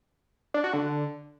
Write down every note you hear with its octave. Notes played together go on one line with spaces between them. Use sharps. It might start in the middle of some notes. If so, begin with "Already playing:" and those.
D4
F#4
D3